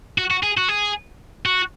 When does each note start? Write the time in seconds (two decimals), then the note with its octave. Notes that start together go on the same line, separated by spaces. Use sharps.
0.18 F#4
0.31 F#4
0.43 G#4
0.58 F#4
0.69 G#4
1.46 F#4